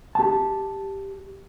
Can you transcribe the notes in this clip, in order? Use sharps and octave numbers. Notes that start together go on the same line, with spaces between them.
G4 A5